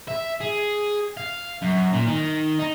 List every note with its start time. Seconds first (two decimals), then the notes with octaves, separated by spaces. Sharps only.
0.08 E5
0.41 G#4
1.17 F5
1.62 F#2
1.93 A#2
2.07 D#3
2.59 D#4